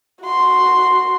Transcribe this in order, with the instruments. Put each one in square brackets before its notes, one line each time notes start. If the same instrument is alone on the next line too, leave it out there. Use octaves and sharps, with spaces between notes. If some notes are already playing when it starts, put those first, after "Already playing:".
[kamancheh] F#4 C6